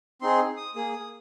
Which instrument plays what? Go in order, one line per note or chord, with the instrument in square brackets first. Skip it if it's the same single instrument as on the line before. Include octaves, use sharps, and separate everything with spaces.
[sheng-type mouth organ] C4 D#4 G#4 C6
D#6
A#3 G#4 D#6
D#6